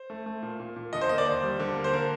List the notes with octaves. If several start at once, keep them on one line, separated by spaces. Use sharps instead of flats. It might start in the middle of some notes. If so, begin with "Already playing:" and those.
Already playing: C5
A3
A3
A#2
A#2
A#2
D3 D#5
C5
A#3 D#5
D5
D#2 C5
G3
D3
A#3
C5
D3 A#4